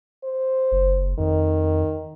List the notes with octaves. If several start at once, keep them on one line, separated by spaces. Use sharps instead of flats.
C5
F#1
F2 D#3